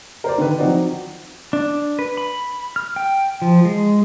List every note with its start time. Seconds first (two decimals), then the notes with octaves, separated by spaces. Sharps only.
0.24 A#4 C5 D5
0.38 D3 D#3 B4
0.58 F3 F#3 C4 D#4 F#4 D5
1.53 D4
1.99 B4
2.17 B5
2.76 F6
2.96 G5
3.42 F3
3.65 G#3